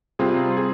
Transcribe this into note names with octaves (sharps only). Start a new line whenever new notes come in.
C3 G3 C4 F4 G#4
F4 G#4